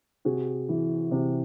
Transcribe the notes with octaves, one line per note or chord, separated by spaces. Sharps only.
C3 F#4 G#4
E3
C3